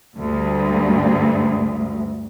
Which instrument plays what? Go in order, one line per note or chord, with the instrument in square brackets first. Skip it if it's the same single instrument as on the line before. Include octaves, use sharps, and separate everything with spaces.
[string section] D2 G2